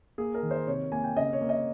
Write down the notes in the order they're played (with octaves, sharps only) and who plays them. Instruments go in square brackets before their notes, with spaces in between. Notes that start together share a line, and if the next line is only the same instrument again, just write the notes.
[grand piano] A#3 G#4
A#4
D#3
C5
C3 C#5
A#3 G#5
G5
C#3 D#5
C#5
A#3
D#5